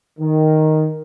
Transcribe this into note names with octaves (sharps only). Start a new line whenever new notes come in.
D#3